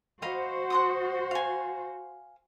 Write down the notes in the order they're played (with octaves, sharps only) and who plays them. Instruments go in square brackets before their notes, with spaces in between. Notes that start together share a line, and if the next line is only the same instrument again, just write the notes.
[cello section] F#4 C5 [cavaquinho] D#5 F5 B5
[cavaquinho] F#5 C6 D#6
F5 G#5